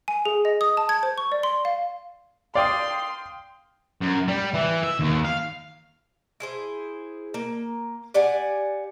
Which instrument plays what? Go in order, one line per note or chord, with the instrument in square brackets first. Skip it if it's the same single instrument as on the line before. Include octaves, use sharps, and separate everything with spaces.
[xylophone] G#5
G#4
D#5
D#6
A5
G#6
C5
C#6
D5
C6
F5
[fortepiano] D5 [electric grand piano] F5 G5 D#6 [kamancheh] C6
[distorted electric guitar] F#2
G3
E3
E5
D#2
F5
[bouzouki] E4 G#4 C5
A#3
G4 D5 F#5 G#5